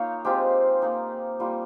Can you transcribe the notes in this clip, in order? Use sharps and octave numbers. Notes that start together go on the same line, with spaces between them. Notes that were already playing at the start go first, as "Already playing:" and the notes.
Already playing: A#3 D#4 F4 C#5 F5 G5
G#3 C4 F4 G4
A#3 D#4
G3 A#3 F4